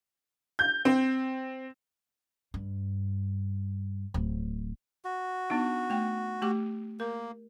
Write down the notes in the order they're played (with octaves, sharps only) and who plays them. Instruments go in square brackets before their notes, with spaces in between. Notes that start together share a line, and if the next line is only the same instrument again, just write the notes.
[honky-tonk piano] G6
C4
[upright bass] G2
D1
[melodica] F#4
[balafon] B3 D4 D#4
A3 G5
A3 G4 D6
[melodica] A#3 [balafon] A#4